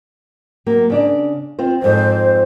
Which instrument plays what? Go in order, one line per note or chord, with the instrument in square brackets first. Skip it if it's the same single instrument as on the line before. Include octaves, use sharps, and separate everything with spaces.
[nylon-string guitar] F#3 A#3
C#3 D4 D5
C4 F4 C5
[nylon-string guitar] F2 G#2 A4 [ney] C5